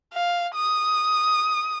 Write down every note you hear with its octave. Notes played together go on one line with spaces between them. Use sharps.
F5
D#6